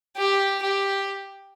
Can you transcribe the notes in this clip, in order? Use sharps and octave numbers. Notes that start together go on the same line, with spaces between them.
G4
G4